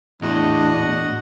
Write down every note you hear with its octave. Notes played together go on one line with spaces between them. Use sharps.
E2 A2 D4 F#4 D#5 F#5